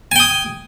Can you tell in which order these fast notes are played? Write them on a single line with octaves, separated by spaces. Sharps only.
G#5 G5 D#6